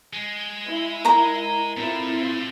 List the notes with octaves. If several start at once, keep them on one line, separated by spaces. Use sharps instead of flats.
G#3
E4
A#4 A#5
A2 A3 C4 E4 F4